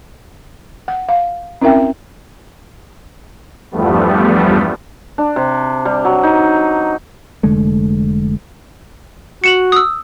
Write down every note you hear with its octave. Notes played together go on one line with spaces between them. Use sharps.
F#5
F5
C4 C#4 E4 A#4 E5 G5
E2 G2 F3 G3 A3 B3
D4
C3
G3
F#3
D#4
F1 D3 G#3 A3
F#4 C#7 E7 F#7
D#6 E6